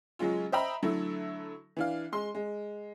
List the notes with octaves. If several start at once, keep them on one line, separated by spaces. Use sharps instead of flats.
C#3 F#3 G#3 C#4 F4
C5 D#5 E5 G5 A#5 B5
D3 F#3 A3 E4 A4
E3 D4 F5
G#3 C6
G#3